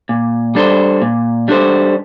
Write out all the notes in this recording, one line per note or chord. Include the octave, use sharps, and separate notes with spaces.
A#2
G3 D4 A4 C5
A#2
G3 D4 A4 C5